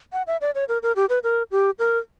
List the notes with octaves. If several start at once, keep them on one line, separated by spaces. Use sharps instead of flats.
F#5
E5
D5
C#5
A#4
A#4
G4
B4
A#4
G4
A#4